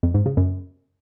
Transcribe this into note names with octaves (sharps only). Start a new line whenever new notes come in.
F2
G#2
C#3
F#2